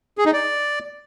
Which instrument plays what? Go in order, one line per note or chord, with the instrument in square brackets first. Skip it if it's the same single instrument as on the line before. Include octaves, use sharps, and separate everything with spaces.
[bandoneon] G#4
D#4
D5